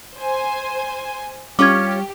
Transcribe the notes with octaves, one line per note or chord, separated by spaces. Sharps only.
C5 G#5
G3 C#4 F4 G4 C#5 D6 G#6